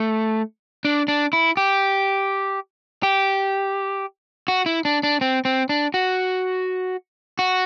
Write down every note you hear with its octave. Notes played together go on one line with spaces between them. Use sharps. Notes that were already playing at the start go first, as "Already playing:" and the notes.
Already playing: A3
D4
D4
E4
G4
G4
F#4
E4
D4
D4
C4
C4
D4
F#4
F#4